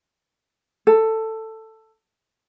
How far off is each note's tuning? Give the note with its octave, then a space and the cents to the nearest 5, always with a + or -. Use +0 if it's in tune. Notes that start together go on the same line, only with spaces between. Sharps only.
A4 +10